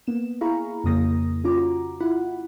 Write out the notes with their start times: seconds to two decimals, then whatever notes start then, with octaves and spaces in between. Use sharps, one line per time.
0.07 A#3 B3 E7
0.41 E4 G#4 F5 A#5 B5 C#6
0.84 F2 C#3 A#3 D#6 A#6
1.44 C#4 F4 A#5 D6
1.57 F#4
2.00 E4 F4 F#5 B5